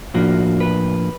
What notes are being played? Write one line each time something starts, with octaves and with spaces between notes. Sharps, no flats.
A2 F3 A#3 D4 F#4
B4